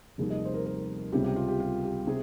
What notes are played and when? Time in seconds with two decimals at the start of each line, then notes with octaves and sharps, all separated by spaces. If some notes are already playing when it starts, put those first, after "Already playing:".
0.18 F1 D#2 D#3 G3 G#4
0.30 D#5
0.45 C5
0.54 A#4
0.66 A#4
1.12 C#2 C3 G3 G4
1.24 G4
1.36 F4
1.48 G4
1.60 F4
1.84 G4
2.07 C3 G#4